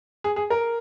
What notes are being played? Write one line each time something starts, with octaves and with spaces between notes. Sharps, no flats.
G#4
G#4
A#4